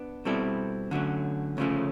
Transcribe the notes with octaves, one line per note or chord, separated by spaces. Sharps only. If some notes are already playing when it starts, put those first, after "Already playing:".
Already playing: B3 D4
B2 G3 C4 E4 A4
D3 F#3 A3 C#4
D2 C#3 F3 A3 C#4